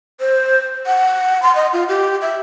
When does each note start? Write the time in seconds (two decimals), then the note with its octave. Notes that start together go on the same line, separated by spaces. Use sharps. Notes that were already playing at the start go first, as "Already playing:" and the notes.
0.20 C5
0.87 F#5
1.43 C6
1.55 D#5
1.73 F4
1.89 G4
2.22 E5